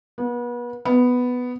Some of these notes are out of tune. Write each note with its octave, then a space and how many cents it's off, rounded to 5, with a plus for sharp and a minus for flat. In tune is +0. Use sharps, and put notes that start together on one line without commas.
B3 -35
B3 +5